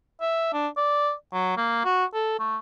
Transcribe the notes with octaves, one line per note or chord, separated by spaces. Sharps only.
E5
D4
D5
F#3
A#3
F#4
A4
A3